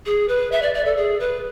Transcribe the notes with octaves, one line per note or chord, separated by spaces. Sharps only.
G#4
B4
E5
D5
D5
A4
G#4
B4